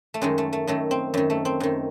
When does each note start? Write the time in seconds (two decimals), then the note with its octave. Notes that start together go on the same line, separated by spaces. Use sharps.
0.14 A3
0.21 F#2 D#3 G#3
0.38 A3
0.53 A3
0.67 F#2 D#3 A3
0.91 C4
1.14 F#2 D#3
1.30 A3
1.45 C4
1.60 F#2 D#3